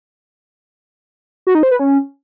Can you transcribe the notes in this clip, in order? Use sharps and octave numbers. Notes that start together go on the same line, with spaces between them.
F#4
D#4
C5
B4
C#4